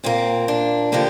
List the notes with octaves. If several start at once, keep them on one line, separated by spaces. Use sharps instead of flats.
A#2 A#3 C4
D4
D3 F3 A#3 G4